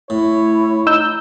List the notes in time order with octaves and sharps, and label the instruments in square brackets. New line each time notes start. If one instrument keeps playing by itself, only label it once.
[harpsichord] A2 [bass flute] E4 [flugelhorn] C#5
[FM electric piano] D#4 E6 G6